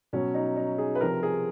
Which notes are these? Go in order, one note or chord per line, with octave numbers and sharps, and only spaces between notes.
B2 F#3 C#4
D#4
D#4
G#4
B4
C3 F3 A#4
G#4